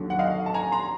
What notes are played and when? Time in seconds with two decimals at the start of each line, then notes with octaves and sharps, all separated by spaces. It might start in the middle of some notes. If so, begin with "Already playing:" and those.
Already playing: D#2 D3 F#3
0.10 F#5
0.19 D#5 F5
0.46 A5
0.54 G#5 A#5
0.72 A#5 C6